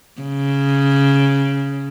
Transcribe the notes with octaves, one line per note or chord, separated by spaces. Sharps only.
C#3